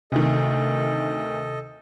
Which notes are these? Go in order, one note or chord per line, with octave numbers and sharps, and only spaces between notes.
D2 C3 D#3 A4 D#5